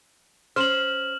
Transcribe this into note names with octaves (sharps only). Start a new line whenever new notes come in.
C#4 C5 F6 E7 F#7